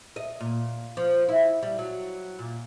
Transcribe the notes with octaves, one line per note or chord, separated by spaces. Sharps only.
D#5
A#2
F3
E4
G3
F#3
A#2